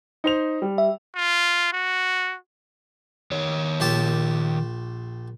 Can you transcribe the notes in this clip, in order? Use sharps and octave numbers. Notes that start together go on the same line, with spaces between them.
D#4 C5 F7
G3
E5
F4
F#4
D#3 C#5
A#1 G4 A5